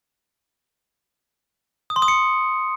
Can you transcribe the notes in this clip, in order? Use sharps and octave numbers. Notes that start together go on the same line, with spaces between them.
D#6
C6
D#6
C#7